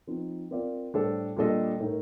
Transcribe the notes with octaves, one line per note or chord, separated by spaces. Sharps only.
F3 C4 D#4
C4 F4 A#4 D5 F5
A2 G3 D4 A4 C5
A#2 G3 D4 A4 D#5
A2 A3 D#4 A#4